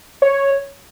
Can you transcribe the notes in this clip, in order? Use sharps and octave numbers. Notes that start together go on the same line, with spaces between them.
C#5